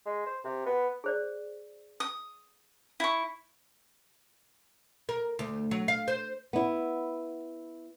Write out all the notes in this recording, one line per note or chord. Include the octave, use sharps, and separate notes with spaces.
G#3
C5
C3
B3
G#4 C5 D5
D#6
E4 C#6
A#4
D2
F#3
F5
C5
B3 E4